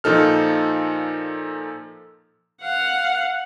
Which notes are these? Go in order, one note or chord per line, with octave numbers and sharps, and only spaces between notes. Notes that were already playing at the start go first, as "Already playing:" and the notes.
A#2 F3 D#4 A4 F6
F5 F#5